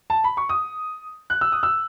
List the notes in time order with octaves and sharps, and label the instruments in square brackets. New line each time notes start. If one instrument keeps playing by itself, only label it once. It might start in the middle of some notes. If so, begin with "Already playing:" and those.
[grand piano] A5
B5
C#6
D#6
F#6
E6
D#6
E6